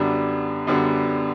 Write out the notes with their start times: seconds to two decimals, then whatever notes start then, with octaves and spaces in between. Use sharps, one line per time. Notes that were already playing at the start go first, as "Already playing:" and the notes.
Already playing: F#2 D3 G3 B3 D4
0.67 F#2 D3 G3 B3 D4